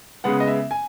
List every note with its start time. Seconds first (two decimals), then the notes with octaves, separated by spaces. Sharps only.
0.24 C#3 G#3 B3 F#5
0.40 D#5
0.47 E5
0.71 G#5